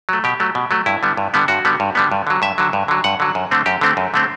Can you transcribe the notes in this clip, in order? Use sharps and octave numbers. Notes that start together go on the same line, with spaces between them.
F#3 A3
B2 G4
F#3 A3
B2
F#3 A3
G2 E4
D3 G3 B3
G2
D3 G3 B3
G2 F#4
D3 G3 B3
G2
D3 G3 B3
G2
D3 F#3
G2 E5
D3 F#3
G2
D3 F#3
G2 F#5
D3 F#3
F#2
D3 A3 C4
F#2 G4
D3 A3 C4
F#2
D3 A3 C4